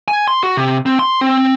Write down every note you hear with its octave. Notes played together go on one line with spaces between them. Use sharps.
G#5
C6
F#4
C3
C4
C6
C4